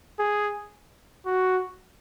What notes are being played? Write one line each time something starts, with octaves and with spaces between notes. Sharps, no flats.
G#4
F#4